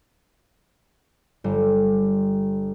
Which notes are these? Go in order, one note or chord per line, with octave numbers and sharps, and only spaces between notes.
G1 G3